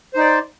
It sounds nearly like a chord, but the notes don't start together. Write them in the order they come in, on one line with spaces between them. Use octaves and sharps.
C5 D#4 D5